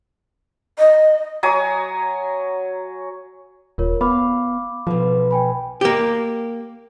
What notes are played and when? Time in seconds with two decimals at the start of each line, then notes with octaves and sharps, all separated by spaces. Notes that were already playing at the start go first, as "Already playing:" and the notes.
0.78 D#5
1.43 F#3 C#5 G#5 D#6
3.78 D#1 F4 A#4 C#5
4.01 B3 F5 B5 D6
4.87 B1 B2 F3
5.31 G5 G#5 B5
5.81 A#3 G4